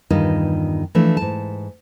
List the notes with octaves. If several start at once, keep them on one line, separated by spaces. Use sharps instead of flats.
E2 G2 D#3 F4 G4 D#5
E3 F3 A3 D4
G#2 A5